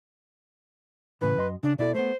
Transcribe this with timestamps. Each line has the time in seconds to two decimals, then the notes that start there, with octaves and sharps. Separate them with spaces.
1.21 A2 C#3 E3 B4
1.37 F#2 D#5 C6
1.63 C#3 D4
1.79 B2 E4 A4 D5
1.95 A3 B3 C5